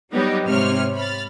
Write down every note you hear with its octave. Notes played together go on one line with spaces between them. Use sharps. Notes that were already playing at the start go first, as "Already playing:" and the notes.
F#3 G3 B3 D#4 G4 C#5
G#2 C3 C#5 F6
B5 F6 A6